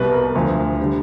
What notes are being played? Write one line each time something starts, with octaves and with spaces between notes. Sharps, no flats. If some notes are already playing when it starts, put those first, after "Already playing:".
Already playing: C2 B2 G3 B4
A#4
D2 D3 F3
D3 G3